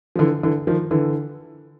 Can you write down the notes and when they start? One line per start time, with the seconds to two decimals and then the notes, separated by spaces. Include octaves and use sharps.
0.16 F3
0.19 D3 E3
0.43 D3 E3
0.67 D#3 F3
0.91 D3 E3